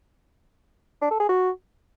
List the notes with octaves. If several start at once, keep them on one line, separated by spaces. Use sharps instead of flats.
D4
A4
G#4
F#4